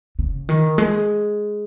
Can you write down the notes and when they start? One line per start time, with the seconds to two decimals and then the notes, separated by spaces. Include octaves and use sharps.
0.19 C#3
0.49 D#3
0.78 G#3